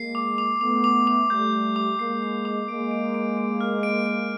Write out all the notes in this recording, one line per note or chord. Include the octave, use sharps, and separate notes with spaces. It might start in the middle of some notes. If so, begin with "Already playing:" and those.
Already playing: G#3 A#3 C7
D6
D6
A3 B3 D6
D6
D6
G3 A3 G6
G6
D6
G#3 A#3 C7
C7
D6
G#3 A#3 D7
D7
D7
D7
F6
D7
D7